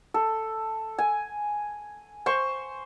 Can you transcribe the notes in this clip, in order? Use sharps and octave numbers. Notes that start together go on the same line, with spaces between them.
A4
G#5
C5 C#6